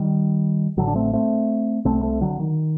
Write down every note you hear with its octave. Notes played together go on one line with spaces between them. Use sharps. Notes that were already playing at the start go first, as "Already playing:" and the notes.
Already playing: D#3 G3
A1 A2 D3 F#3
D4
A3 C4
A3 C4
C2 C3 A3 C4
A3 C4
D3 F#3
D#3